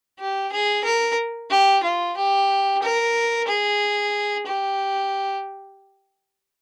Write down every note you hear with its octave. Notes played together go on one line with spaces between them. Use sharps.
G4
G#4
A#4
G4
F4
G4
A#4
G#4
G4